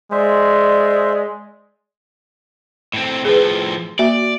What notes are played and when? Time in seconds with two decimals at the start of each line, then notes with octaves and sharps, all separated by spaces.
0.12 G#3 C5 D5 E5
2.94 A2 C4
3.25 A2 F3 G#4 B4
3.99 A#3 F#4 D5 E5